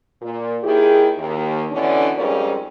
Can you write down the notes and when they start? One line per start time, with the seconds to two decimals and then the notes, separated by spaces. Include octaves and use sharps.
0.22 A#2
0.64 D#2 D#3 E4 G4 G#4
1.18 D#2
1.71 B2 D3 E3 C#4 D4
2.17 F2 G#2 G3 C#4 F4 A#4